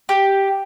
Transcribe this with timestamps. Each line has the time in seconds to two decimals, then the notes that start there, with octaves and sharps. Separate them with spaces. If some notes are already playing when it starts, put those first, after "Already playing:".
0.09 G4